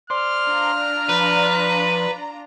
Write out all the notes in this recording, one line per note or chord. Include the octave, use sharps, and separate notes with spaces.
C5 D5 C6 F6
D4 F4 A#5
F3 B4